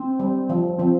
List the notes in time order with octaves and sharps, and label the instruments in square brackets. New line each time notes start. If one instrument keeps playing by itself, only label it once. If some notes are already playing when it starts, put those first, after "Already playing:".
Already playing: [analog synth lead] C4
[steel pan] G3
F3
[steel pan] F3 [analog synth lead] C4